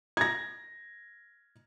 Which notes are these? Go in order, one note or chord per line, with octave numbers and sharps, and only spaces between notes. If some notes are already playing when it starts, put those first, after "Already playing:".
G#6 A#6